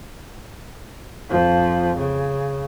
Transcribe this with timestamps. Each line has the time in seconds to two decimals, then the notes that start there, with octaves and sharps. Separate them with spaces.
1.30 F2 F3
1.98 C#3